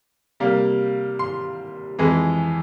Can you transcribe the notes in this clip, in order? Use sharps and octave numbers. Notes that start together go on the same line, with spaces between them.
C3 G3 A#3
C6
F2 E3 G#3